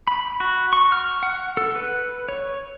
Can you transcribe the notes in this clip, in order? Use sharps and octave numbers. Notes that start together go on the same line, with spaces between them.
B5
F#4
C#6
F6
F#5
A4
B4
C#5